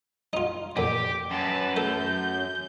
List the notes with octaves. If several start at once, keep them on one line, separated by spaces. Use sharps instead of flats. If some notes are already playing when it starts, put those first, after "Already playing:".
D#4 F4
F2 A#2 G4 G5 D6
F#2 B4 A5
A3 A4 G6